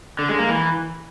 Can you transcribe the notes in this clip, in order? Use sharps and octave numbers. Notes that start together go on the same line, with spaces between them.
D3
G#3
A#3
E3